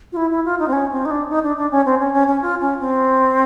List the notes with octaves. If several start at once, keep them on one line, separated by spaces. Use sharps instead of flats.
F4
E4
E4
F4
D#4
C4
C#4
C4
D#4
D4
D#4
D4
D4
C#4
C4
C#4
C#4
C#4
F4
C#4
C4